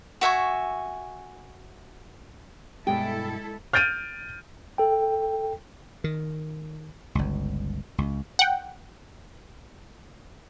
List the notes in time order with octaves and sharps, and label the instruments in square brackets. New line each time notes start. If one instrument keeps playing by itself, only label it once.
[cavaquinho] F#4 E5 G#5 C#6
[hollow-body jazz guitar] G2 B2 G4 [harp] G#3 [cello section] E4 A4 [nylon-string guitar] G5
[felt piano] F6 G6 A6 D7 D#7
[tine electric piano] A4 G5
[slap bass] D#3
G1 C#2
C#2
[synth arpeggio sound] F#5 G5